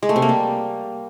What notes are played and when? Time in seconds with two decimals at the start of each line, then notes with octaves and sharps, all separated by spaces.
0.03 G#3
0.09 A3
0.16 C3
0.22 A#3
0.29 G3